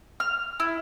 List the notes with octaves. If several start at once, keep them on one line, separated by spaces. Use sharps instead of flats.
F6
E4